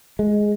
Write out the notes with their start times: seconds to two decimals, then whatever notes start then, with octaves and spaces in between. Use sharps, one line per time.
0.19 G#3